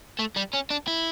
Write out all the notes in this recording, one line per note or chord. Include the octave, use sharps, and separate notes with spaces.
A3
G3
C#4
D4
E4